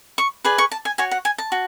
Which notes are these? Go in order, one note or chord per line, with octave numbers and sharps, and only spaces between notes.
C#6
G#4 B4 D5
C#6
A5
G#5
F#4 C#5 G#5
F#5
G#5
A5
F#4